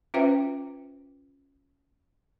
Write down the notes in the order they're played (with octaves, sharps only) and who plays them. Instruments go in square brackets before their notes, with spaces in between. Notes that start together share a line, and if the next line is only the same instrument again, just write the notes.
[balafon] C#4 F4 B4 C5 E5 G5